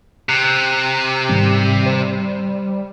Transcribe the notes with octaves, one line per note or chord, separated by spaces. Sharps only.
C3 F#6
G#2 D#3 G3 C4
C5